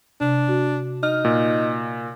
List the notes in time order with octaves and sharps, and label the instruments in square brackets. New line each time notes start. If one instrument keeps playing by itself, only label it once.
[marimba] C3 [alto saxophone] D4
[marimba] F#4
[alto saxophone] D#4 [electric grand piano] F6
[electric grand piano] A#2